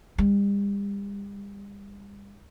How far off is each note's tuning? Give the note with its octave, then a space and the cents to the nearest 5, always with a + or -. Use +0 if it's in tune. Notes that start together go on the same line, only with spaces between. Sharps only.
G3 +40